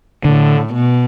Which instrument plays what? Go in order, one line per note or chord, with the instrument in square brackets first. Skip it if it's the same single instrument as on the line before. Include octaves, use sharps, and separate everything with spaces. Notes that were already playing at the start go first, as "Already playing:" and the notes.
[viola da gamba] A2 [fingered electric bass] D3
[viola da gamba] B2